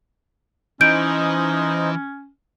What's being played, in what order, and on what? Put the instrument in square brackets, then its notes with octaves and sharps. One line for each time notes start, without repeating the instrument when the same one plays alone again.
[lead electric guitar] E3 [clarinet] C#4 [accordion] D#4 C5 D#5 [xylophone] G6 D7